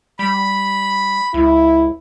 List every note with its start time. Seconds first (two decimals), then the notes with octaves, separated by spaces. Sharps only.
0.19 G3 B5
1.34 C#2 E4